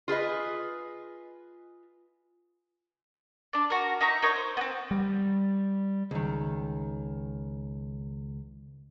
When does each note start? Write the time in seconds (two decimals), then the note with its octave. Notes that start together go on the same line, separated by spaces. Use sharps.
0.08 F4 G#4 B4 D#5
3.53 D4 D5
3.70 F#4 A#4
4.01 D#4 E4 A#5 C#6
4.22 D#4 A#4 C#5 D#5
4.36 C5
4.57 B3 C4
4.91 G3
6.11 C#2 D#3